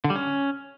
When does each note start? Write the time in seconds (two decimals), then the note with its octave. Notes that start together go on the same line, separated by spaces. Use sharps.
0.04 D3
0.10 G3
0.16 C#4